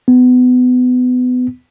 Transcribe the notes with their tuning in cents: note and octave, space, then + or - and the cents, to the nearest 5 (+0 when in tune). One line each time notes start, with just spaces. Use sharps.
B3 +25